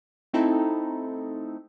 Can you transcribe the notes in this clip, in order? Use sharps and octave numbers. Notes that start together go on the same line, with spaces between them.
A3 C4 D#4 E4 A4